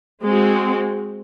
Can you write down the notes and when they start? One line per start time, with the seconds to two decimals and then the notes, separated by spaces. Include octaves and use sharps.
0.24 G#3 C4 F#4